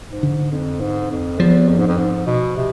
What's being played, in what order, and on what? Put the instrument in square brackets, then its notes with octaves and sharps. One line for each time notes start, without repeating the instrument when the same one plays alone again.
[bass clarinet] G#2
[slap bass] D3
[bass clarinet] F2
G#2
F2
[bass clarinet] E2 [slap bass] F3
[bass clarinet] F2
G#2
F2
G#2
B2
C3